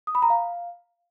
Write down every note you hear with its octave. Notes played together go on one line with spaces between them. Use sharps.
D#6
B5
A#5
F5